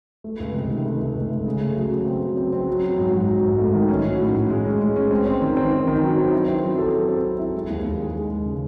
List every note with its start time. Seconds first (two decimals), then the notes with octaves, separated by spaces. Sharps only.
0.24 A3
0.40 C#2
0.55 C3
0.70 D#3
0.86 A3
1.01 A3
1.15 C#2
1.30 A3
1.46 C#3
1.61 A3
1.76 F#3
1.92 C#3
2.06 C4
2.22 F#3
2.37 C4
2.53 C4
2.67 F#3
2.82 F#3
2.98 G#2
3.13 F#3
3.29 G#2
3.44 G#2
3.59 A3
3.74 D#3
3.89 C#4
4.05 F#4
4.20 A2
4.35 A2
4.50 G#3
4.65 C#4
4.81 G#3
4.96 C#4
5.11 C4
5.27 C4
5.42 D#3
5.57 C4
5.72 D#3
5.87 D#3
6.03 F#3
6.17 C4
6.33 E4
6.48 C4
6.64 F#3
6.78 A4
6.94 A4
7.09 C4
7.25 E4
7.40 E4
7.54 G#3
7.70 D#2
7.85 D#2
7.99 G#3
8.16 G#3
8.31 G#3
8.45 C#3